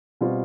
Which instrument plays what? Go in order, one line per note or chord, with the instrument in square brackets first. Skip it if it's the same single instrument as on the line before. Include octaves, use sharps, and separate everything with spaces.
[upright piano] B2 G3 C4 F4